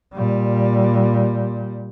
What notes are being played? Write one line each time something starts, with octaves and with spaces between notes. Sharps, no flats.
A#2 G3